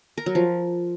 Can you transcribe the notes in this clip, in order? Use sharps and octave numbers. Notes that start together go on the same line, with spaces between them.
A#4
F#3
F3